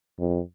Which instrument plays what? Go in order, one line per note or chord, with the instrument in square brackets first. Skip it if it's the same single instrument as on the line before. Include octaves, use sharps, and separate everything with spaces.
[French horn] F2